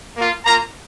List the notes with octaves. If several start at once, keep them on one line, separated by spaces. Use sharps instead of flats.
A#3 F4
A#3 F4 A#4 A#5